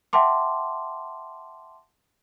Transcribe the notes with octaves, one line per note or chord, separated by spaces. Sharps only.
E5 F#5 G5 A5 C6 D6